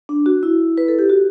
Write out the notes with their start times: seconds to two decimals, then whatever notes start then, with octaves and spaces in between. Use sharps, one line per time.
0.09 D4
0.26 F#4
0.43 E4
0.78 B4
0.88 A4
0.99 G4
1.10 F#4